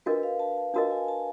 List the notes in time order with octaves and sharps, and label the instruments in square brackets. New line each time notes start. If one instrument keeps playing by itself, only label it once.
[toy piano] D4 F#4 A#4 D#5 [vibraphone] B4
[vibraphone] F5
A5
A5
[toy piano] D4 F#4 A#4 D#5 [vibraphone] A5
[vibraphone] G#5
A5